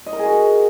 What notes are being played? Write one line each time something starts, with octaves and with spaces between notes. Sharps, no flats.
D#5
A#4
G#4
F#4